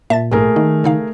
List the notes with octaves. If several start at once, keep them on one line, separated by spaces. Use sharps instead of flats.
A#2 E5 A5 A6
A#1 G#2 A3 G#4 A#4
D#3 A#3
C#3 D#4 F5